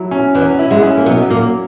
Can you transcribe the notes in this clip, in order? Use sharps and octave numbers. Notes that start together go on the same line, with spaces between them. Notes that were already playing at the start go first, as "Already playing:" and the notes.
Already playing: F#3 E4
C#4
E2 E3 B4
E4
G#2 G#3
C#4
A#3
B2 F#3 B3
A#2 F#3 A#3